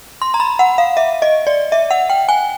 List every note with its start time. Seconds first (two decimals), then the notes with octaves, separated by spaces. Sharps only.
0.22 C6
0.34 A#5
0.40 B5
0.59 F#5
0.78 F5
0.97 E5
1.22 D#5
1.47 D5
1.72 E5
1.91 F#5
2.10 G5
2.29 G#5